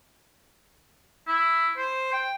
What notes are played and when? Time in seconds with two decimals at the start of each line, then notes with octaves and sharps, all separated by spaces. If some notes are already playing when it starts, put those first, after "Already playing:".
1.27 E4
1.77 C5
2.13 G5